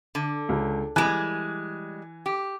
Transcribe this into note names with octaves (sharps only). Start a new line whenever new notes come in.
D3
C#2
E3 G3 G#3 G#5 F#6
G4